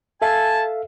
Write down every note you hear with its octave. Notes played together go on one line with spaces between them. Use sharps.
A4 E5 F5 G#5 A5